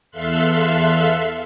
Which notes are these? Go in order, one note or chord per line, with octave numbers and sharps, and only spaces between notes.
E2 A4 E5 F5 C6 F#6